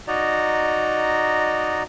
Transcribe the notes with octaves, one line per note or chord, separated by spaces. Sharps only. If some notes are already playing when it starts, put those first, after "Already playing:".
D#4 F#4 D5 D#5 A#5